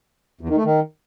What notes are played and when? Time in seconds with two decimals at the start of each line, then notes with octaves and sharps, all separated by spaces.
0.41 E2
0.49 D#3
0.57 A3
0.65 D#3